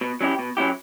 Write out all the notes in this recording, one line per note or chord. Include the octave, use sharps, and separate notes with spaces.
B2
F#3 C#4 E4 G4
B2
F#3 C#4 E4 G4